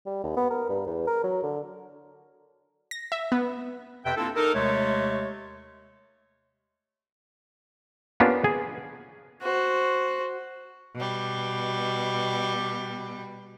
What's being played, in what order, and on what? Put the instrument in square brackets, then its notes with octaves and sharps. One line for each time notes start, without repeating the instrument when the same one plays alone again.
[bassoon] G3
D#2
B3
A#4
G2
E2
A#4
F#3
D3
[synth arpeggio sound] A#6
E5
B3
[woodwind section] F2 C3 B4 E5 G5
A#3 C4 D4 E4 F4 A4
D#4 A4 A#4
D#2 C3 G#3 A3 C#5
[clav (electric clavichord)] A#3 B3 C#4 D4 F4 G4
G#4
[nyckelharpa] F#4 C5
[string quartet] B2 G3